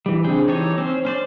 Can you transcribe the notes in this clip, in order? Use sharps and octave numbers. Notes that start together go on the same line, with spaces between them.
E3 G3
C#3 C4 D4 G#4 G5
E3 D#4 G4 A4 C#5
C4 C#4 C5
C#4 C5 D5